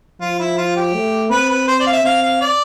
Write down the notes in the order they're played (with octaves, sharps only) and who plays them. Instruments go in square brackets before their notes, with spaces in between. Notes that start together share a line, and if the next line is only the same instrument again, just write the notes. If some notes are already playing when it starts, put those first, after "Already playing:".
[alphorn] F3 [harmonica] F4
[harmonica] E4
F4
G4
[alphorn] A3
[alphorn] C4 [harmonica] B4
[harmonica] B4
C5
D5
F5
E5
[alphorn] C4 [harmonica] F5
[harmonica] F5
D5